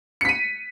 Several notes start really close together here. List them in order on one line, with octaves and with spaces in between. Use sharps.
C#7 B6 D#7